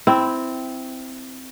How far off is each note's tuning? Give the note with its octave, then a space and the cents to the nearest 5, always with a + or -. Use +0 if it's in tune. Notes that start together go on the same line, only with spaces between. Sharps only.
C4 -10 E4 +0